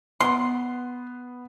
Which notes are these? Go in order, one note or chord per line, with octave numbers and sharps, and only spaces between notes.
B3 C6